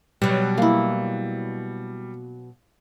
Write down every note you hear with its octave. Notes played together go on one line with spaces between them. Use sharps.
B2 F#3 G3
A#3 E4